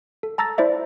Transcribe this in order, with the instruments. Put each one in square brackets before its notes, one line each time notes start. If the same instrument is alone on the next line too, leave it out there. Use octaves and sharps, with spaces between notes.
[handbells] A4
A5 A#5 E6 A6 A#6
E4 C5 D5 E5